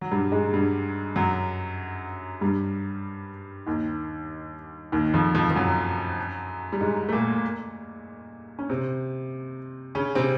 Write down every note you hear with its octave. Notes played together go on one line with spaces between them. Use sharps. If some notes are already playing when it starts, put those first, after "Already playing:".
F#3
G2 G3
G#2 G#3
G2 G3
F#2 F#3
G2 G3
D#2 D#3
D#2 D#3
F2 F3
F2 F3
F3
F#2 F#3
G3
G#2 G#3
A3
A#2 A#3
C#4
C3 C4
C#3 C#4
C3 C4